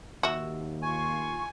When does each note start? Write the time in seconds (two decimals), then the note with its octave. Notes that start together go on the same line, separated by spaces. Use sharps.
0.23 D#2 F#4 E5
0.82 F4 G#5 C#6